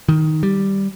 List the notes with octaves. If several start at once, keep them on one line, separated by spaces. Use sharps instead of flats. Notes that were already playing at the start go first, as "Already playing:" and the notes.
D#3
G3